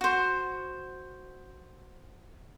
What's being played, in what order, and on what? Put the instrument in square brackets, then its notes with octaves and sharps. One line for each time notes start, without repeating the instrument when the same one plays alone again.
[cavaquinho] F#4 C5